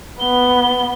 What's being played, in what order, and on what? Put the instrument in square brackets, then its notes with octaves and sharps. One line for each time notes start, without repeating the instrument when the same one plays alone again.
[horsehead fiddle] B3 [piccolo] G7